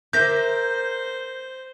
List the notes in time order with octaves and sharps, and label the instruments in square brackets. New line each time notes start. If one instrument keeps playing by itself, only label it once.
[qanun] A#4 E5 D6 [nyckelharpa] C5 [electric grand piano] G6 A#6